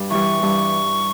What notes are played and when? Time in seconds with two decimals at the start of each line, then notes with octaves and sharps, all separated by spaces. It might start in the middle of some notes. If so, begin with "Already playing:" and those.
Already playing: G2
0.10 E3 G3 C#6
0.43 G2